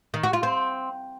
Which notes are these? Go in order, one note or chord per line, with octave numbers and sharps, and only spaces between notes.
D#3
F#4
F4
C4